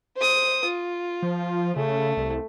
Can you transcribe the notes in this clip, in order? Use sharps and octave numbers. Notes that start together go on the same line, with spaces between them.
C5 D#6
F4
F3
C#3 A3
C2